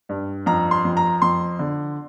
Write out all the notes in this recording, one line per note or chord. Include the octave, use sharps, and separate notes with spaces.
G2
F2 A#5
C6
F2
A#5
F2 C6
D3